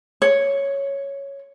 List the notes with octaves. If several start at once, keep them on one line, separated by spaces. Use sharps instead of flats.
C#5